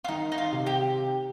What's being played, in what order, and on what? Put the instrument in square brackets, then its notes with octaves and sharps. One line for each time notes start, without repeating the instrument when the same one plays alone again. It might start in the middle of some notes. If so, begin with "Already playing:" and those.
[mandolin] F4
[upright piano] D#3 [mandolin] D#4
[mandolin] D#4
F4
[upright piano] C3
[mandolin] G4